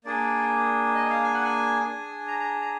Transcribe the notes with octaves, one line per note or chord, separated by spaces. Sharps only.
A#3 D4 G#4 D5
D#5
F5
G#5
F#5
G#5
D4 G#4
A#5
A#5
A#5